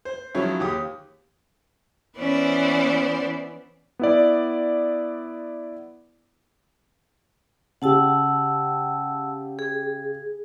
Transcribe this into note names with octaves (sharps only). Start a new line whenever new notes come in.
C5
D#3 F3 F#3 G#3 C#4 E4
D#2 G4 D#6
E3 B3 C#4 B4 C5 D5
B3 E4 D5
C#3 G4 F#5 A5 E6
G#4